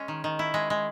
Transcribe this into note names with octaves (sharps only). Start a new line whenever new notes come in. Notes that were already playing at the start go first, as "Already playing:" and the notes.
Already playing: G#3 C#4
D#3
D#3
E4
G#3
G#3